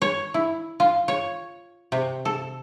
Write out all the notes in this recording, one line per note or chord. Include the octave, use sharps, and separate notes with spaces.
C#5
E4
F4
C#5
C3
A4